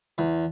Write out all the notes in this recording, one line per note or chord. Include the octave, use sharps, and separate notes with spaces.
E2